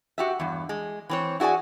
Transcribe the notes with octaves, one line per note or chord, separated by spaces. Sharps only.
F#4 G4 E5
E2 G2
G#3
E3 C4 C#5
E4 F#4 G#4 D5 G#5